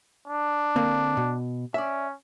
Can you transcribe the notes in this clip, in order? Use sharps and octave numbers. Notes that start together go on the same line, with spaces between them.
D4
D3 A#3 C4
B2
C#4 D5 E5